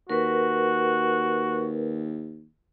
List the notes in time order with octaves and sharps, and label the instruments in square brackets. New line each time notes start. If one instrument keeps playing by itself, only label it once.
[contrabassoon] D#2 [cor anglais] F#4 [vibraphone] A#4 B4